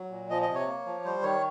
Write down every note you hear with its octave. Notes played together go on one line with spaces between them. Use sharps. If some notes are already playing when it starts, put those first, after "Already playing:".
Already playing: F#3
A#2
F3 D#5
D#5
C3
C#5
A#3
F3
G3 C5
D#3 C#5